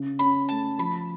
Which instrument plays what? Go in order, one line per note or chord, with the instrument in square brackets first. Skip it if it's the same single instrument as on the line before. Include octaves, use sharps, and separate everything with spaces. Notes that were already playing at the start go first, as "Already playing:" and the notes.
Already playing: [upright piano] C#3
[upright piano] C#4 [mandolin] B5
[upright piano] A3 [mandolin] A5
[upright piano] F3 [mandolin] B5